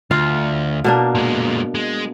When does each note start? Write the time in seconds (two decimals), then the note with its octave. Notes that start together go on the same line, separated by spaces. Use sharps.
0.11 D2 F4
0.84 B2 A#3 D4
1.15 A#2 G#3
1.75 G#3